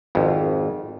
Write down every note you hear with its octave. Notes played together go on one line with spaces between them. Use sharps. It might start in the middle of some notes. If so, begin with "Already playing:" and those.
G#1 F2